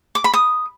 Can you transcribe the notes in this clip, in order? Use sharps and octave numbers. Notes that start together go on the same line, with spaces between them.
D6
B5
D#6